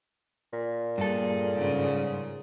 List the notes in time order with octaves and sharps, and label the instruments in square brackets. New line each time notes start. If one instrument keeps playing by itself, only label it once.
[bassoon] A#2
[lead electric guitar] G2 A4 [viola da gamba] A#3 G#4
[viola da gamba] G#2 C#3